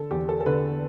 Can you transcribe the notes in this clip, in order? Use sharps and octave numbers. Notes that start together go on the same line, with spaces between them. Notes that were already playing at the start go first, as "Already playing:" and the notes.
Already playing: D3 A4
E2 G4
A4
A4
D3 B4